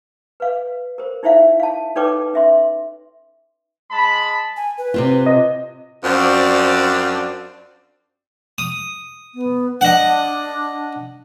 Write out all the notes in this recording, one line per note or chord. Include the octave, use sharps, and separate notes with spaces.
B4 F5
A#4 C5
D#4 E4 C5 E5 F5
F5 A5
D#4 A4 B4 C#5 G5 D6
C#4 E5 C6
G#3 A5 B5
G#5
B4
C3 C4 F4
D#5
F#2 F3 C4 D4 D5
D#6
B3
D4 D#5 F#5